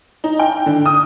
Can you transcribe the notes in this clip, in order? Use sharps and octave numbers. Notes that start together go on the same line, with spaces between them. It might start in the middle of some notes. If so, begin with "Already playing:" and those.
D#4
G5
D3
D#6